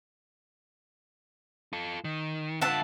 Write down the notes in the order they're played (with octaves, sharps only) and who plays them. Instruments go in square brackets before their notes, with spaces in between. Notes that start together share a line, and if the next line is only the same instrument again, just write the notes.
[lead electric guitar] F4 A4
D#3
[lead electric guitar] D3 F4 [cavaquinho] E5 F#5 A5